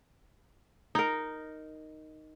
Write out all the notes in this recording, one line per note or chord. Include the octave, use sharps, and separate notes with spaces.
D#4 A#4